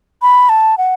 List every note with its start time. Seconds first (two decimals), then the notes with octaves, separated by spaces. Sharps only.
0.22 B5
0.49 A5
0.78 F#5